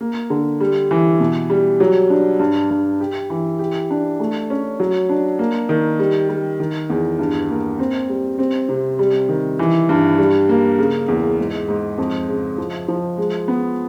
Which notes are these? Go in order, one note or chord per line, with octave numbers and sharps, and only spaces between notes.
A#3
D3
G3
E3
B2
G3
F#3
D4
G2
G2
G4
E3
G4
D4
A3
C#4
F#3
D4
A#3
D#3
G3
G3
D#3
E2
G2
A#3
C4
G3
C4
C3
G3
D#3
E3
G2
G3
A#3
C#3
E2
G#2
G#2
F2
C#3
F3
F3
G#3
B3